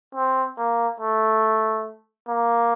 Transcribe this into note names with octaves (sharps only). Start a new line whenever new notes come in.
C4
A#3
A3
A#3